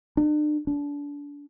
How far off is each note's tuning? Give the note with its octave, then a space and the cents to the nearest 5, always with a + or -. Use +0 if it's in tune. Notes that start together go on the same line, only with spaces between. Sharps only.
D4 +40
D4 -30